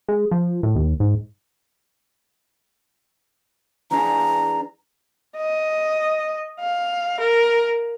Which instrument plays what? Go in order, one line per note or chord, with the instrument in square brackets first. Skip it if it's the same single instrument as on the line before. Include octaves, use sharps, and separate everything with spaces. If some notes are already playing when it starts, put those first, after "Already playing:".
[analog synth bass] G#3
F3
A2
D#2
G#2
[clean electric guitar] E3 D4 G#4 [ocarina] A#5
[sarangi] D#5
F5
A#4